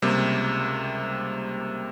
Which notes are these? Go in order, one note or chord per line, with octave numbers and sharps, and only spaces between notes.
C#2 C3 G3 A#3